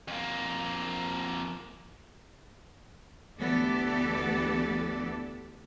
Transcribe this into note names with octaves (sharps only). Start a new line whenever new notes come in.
F2 A#3
D2 E3 B3 G4 A4 D5